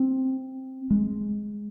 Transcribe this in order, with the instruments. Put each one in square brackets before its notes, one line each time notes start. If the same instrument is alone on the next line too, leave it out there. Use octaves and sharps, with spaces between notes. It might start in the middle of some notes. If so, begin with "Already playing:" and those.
Already playing: [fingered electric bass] C4
G#3